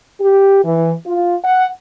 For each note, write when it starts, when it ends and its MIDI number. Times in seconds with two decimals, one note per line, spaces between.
0.21 0.60 67
0.65 0.93 52
1.07 1.36 65
1.44 1.67 78